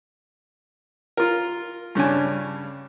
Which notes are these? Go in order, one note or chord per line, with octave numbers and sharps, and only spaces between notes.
F4 A#4
G2 C#3 C#4 D4 G#5